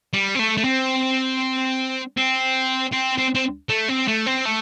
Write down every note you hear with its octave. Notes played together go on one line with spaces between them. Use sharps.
G3
C4
A3
A3
C4
C4
C4
C4
C4
A3
C4
A3
C4
A3